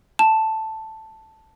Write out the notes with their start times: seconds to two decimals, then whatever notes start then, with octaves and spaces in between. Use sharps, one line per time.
0.19 A5